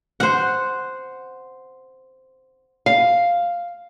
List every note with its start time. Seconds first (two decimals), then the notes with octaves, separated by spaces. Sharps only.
0.20 C5 F#5
2.86 F5